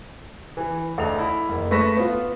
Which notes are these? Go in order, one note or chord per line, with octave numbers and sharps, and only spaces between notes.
E3
D2 A4 D#5 F7
E4
F#1
A3 B4 C#6 A#6 B6 E7
B3 F4